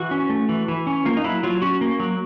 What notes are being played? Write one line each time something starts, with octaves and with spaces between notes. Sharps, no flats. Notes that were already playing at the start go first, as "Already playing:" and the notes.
Already playing: E3 F#4
C#4
A3
E3
E3
C#4
A#3 F4
D#4
F#3 E4
F#3 F4
C#4 F#4
A#3
F#3